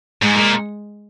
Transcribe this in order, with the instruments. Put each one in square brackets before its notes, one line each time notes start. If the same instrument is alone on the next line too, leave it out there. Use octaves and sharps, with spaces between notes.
[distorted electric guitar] G#2 [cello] G#3
[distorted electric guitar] A#2